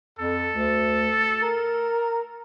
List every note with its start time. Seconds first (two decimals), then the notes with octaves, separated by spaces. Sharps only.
0.19 F2 A4
0.53 D2
1.42 A#4